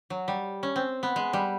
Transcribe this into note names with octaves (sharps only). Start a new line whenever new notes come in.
F#3
G3
C#4
C4
B3
G#3
G3